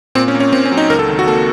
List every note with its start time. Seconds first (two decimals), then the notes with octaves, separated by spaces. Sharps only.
0.15 A#2 C4
0.28 C#4
0.35 A#3
0.40 C#4
0.53 A#2 C4
0.65 C#4
0.72 F#3
0.77 D#4
0.90 C#2 A#4
0.99 A4
1.09 D#3
1.19 F#4
1.28 A#3 A4